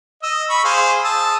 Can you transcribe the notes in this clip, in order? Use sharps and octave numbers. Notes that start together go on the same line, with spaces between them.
D#5 E6
B5 C#6
G#4 C5 F5
A5 D#6 E6